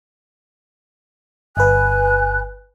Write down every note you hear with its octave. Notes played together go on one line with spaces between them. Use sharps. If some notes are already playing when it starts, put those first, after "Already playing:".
G1 B4 G#5 F#6